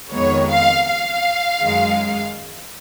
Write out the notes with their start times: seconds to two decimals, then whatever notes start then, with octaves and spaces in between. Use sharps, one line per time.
0.11 F2 D#3 G#3 B3 C#5
0.49 F5
0.87 F5
1.61 F#2 D#3 G#3